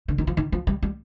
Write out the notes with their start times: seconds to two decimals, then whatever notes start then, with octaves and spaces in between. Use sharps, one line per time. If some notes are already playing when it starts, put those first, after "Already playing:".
0.08 D3
0.18 D#3
0.27 F3
0.37 D#3
0.52 F3
0.67 G3
0.83 G3